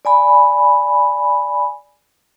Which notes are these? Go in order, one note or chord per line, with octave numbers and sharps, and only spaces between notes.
D5 G#5 B5